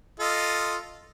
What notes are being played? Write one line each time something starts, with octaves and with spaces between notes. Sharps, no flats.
F4 A4 D#5